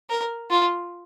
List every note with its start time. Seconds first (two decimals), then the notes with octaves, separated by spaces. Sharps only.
0.10 A#4
0.51 F4